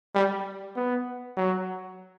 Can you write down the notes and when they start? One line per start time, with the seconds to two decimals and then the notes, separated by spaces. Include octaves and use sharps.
0.15 G3
0.76 B3
1.37 F#3